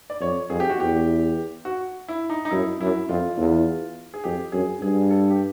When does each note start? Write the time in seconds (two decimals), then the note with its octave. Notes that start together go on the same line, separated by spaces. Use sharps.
0.10 D5
0.21 F2 C#5
0.50 F2 G#4
0.60 G4
0.69 F#4
0.79 E2 G4
1.65 F#4
2.08 E4
2.30 D#4
2.45 D#4
2.51 F#2 E4
2.81 F#2 E4
3.09 F2 F4
3.37 E2
4.14 G#4
4.24 F2 G4
4.52 F#2 G#4
4.81 G2 G#4
5.11 A4
5.30 G4